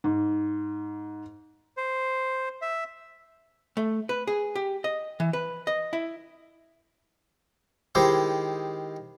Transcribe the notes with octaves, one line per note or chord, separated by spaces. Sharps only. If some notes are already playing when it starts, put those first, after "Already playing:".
G#2
C5
E5
A3
B4
G#4
G4
D#5
E3
B4
D#5
E4
D#3 G#3 E4 G4 C5